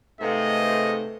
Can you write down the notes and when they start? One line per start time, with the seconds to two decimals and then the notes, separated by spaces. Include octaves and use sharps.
0.21 G#2 C3 A3 A4 B4 D#5 F5